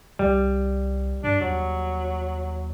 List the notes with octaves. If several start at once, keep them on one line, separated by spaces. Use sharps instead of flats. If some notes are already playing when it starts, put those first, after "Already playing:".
C2 G3
G2 D4
D#2 F#3